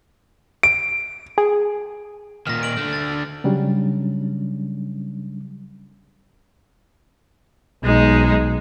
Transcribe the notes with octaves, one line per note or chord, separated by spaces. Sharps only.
D7
G#4
A#2 D#3 F6 A#6
D7 F#7
D3 A3
A6
C#3 F#3 G3 C#4 D4
B1 G#3 D#4